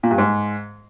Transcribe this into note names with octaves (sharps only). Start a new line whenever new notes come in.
A#2
G2
G#2